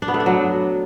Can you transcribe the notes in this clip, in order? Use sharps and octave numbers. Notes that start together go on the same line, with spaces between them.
D4
B3
A3
D4
F#3